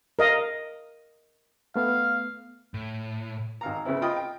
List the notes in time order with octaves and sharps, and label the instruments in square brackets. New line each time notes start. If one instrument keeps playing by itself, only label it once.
[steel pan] A#4 D#5 F5
[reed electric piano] A3 B3 [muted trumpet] F5
[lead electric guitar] A2
[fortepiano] G#1 F5 A#5
C#3 B3 C4 E4
F4 D#5 G5 B5 D#6
G5